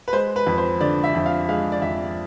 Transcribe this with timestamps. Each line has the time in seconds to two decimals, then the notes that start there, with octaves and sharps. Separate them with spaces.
0.08 B4
0.13 G#3 C5
0.36 B4
0.47 F2
0.58 C5
0.81 D3 D5
1.04 E5
1.15 F2
1.26 F5
1.49 G#3 F5
1.72 D5
1.82 F2 E5